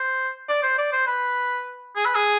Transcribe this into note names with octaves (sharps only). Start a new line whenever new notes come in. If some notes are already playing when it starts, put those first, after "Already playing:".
Already playing: C5
D5
C5
D5
C5
B4
G#4
B4
G#4